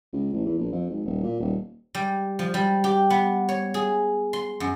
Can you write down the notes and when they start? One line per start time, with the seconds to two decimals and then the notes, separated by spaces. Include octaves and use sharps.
0.13 C#2
0.33 A1
0.46 E2
0.58 A#1
0.72 F2
0.90 G#1
1.05 D#1
1.23 A#2
1.40 D#1
1.95 G3
2.39 F3
2.54 G3
2.84 G4
3.10 B3
3.49 C#5
3.74 G#4
4.33 C6
4.60 F#2